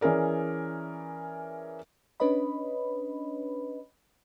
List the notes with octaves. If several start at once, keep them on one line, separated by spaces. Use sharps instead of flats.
E3 C#4 G#4 A#4 D5
C#4 D4 B4 C#5 D#5 B5